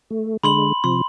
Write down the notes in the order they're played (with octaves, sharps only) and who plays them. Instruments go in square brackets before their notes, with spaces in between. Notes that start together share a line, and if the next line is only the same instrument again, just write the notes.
[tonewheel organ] A3
[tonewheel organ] D3 G#3 [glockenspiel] B5 C6 F#7
[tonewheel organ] C3 F3 [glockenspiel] C6